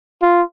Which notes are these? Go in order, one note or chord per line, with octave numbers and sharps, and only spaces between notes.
F4